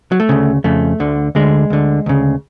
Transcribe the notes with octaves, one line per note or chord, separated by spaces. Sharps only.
F#3
A3
D2 C#3
F2 C#3 A3
D2 D3
D2 D3 G#3
D2 D3
D2 C#3